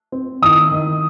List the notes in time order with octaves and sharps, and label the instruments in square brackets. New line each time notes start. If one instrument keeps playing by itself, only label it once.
[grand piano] C4
[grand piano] D#3 [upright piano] D#6
[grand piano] D#3